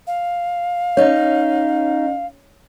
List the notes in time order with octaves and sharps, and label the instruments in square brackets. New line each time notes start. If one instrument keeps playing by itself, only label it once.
[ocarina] F5
[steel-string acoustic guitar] C#4 D#4 [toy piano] C#5